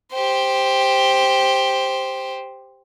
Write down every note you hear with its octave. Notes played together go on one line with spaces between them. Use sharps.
G4 C5